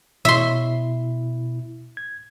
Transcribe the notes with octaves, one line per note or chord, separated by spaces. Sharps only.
B2 E4 E5 C6
G#6